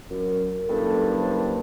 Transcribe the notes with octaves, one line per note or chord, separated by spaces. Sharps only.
F#2 A#4
F#1 G2 A4
C5